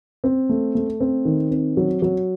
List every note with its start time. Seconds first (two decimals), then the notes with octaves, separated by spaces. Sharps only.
0.24 C4
0.49 A3
0.75 A3
1.00 C4
1.25 D#3
1.51 C4
1.77 F#3
2.02 F#3